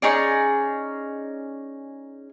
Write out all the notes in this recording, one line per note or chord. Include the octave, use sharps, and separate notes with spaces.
C#4 D#4 G#4 D5